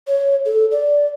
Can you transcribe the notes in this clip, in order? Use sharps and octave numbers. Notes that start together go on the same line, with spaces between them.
C#5
A4
D5